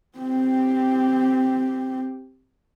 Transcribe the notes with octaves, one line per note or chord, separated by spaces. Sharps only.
C4 G4